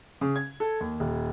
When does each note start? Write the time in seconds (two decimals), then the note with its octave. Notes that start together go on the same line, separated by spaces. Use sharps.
0.21 C#3
0.36 G#6
0.60 A4
0.81 D#2
1.00 D#1